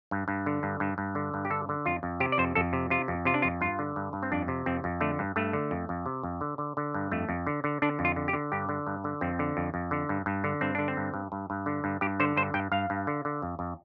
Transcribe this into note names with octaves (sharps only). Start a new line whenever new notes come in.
G2
G2
D3
G2
G2
G2
D3
G2
G4
D3 A4
D3
F2 F4
F2
C3 G4
D5
F2 C5
F2 A4
C3
C3 F4
F2
C3 F4
D4
F2 F4
G2 F4
D3
G2
G2
C4
F2 D4
C3
F2 C4
F2
D3 A3
G2
G2 A3
D3
F2
F2
C3
F2
D3
D3
D3
G2
F2 A3
F2
D3
D3
D3 D4
F2
F4
D3
G4
D3
G2 G4
D3
G2
D3
F2 C4
D3
F2
F2
D3
G2
G2
D3
G2 C4
D3 D4
C4
G2
G2
G2
G2
D3
G2
G2 G4
D3 C5
G2 C5
G2 G5
G2 F5
G2
D3
D3
F2
F2